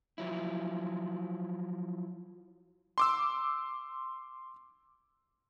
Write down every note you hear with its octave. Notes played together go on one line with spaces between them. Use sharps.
F3 F#3 E4
C6 D6 E6